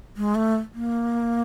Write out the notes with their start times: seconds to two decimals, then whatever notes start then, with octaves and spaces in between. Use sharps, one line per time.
0.17 G#3
0.35 A3
0.74 A#3